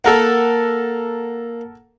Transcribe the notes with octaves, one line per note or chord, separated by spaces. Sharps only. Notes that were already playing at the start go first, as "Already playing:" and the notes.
A#3 A4 A#4 F#5